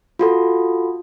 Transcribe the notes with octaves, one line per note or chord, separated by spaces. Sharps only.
F4 F#4 A4